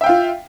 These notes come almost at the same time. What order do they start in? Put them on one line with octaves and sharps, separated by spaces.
E5 G5 F5 F4